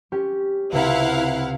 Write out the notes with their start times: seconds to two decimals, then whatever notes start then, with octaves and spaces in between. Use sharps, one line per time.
0.12 C#4 G4
0.72 C#2 C3 E4 F5 F#5